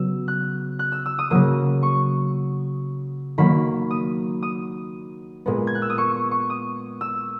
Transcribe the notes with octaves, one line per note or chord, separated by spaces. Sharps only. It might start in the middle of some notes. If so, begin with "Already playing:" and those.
Already playing: C#3 F#3 B3 E6
F#6
F#6
E6
E6
D#6
C#3 F#3 A#3 D#6
C#6
D#3 F#3 A#3 B5
D#6
D#6
A#2 G#3 B3
G#6
F#6
E6
D#6
C#6
C#6
C#6
D#6
E6